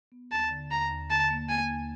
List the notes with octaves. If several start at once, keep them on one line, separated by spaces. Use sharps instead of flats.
B3
D#2 A5
D3
D#2 A#5
D#2
D3 A5
A#3
A#3 G#5
D#2